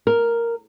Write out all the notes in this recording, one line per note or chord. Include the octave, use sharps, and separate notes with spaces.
A#4